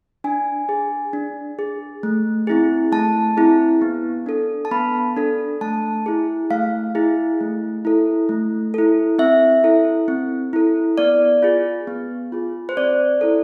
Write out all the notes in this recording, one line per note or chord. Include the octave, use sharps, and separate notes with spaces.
D4 G#5
G#4
D4
G#4
A3
C4 E4 G#4
A3 A5
C4 E4 G#4
B3
D4 A4
A5
B3 B5
D4 A4
A3 A5
E4 G#4
A3 F5
E4 G#4
A3
E4 A4
A3
E4 A4
C4 E5
E4 A4
C4
E4 A4
B3 D5
F4 G#4
B3
F4 G#4
C5
C4 D5
E4 A4